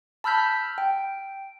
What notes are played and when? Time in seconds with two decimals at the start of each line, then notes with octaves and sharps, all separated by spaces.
0.24 A5 B5 E6 F6 G6 B6
0.78 G5